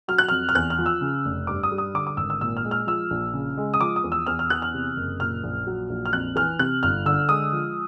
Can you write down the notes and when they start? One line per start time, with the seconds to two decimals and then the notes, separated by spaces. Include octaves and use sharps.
0.08 F#3 F6
0.18 F#6
0.29 F2 F6
0.49 F6
0.55 E2 F#6
0.70 F6
0.79 F3
0.86 E6
1.01 C#3
1.25 F1
1.47 G2 D6
1.63 D#6
1.71 G3
1.78 D#6
1.94 D3 D6
2.07 D6
2.17 G#1 E6
2.30 E6
2.41 A#2 E6
2.57 F6
2.65 G#3
2.71 F6
2.87 F3 E6
3.10 A#1
3.34 C#3
3.58 G#3
3.74 D#6
3.81 F3 D6
3.96 D#6
4.04 E2
4.12 E6
4.27 E2 F6
4.39 F6
4.50 E3 F#6
4.62 F6
4.74 C3
4.97 F#1
5.20 A#2 F6
5.43 A#1
5.67 F#3
5.90 A#1
6.06 F6
6.13 F2 F#6
6.36 E3 F6
6.59 C3 F#6
6.83 G1 F6
7.05 D3 E6
7.29 G#3 D#6
7.53 F3